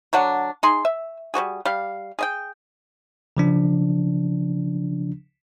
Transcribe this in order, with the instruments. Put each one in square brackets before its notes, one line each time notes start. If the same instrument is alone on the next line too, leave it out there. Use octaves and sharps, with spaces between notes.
[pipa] D3 F#3 D4 F#5
D#4 G#4 C6
E5
G3 C4 F#4 G#4
G3 F5
G#4 D#5 G5
[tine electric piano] C#3 F3 D4